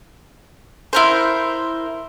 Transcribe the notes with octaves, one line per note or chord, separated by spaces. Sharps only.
E4 A#4 C5